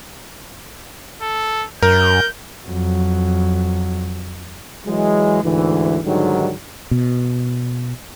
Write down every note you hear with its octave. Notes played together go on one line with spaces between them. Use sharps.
A4
F#2 A#4 G6
F2 F#3
E3 F#3 G#3
D2 G#2 E3
G#2 D3 D#3 F#3 G3
B2